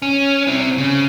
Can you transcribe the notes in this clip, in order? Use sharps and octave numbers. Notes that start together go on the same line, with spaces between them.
C#4
C4 E4
C#3